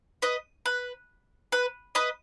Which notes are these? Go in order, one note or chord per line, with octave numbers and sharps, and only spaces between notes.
B4 D#5
B4
B4
B4 D#5